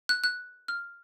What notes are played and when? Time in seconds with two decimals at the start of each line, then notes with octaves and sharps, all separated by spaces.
0.09 F#6
0.24 F#6
0.68 F6